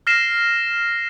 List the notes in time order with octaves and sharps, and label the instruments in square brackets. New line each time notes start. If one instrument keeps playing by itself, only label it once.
[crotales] F6 A#6 C7 E7